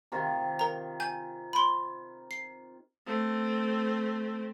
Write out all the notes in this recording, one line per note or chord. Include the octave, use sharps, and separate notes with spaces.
C3 D#3 F4
A#4 A#5
G#5 G6
B5 C6
C7
A3 C4